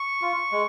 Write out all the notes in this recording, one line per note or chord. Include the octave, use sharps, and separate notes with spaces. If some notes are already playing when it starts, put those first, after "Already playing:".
Already playing: C#6
F4
G#3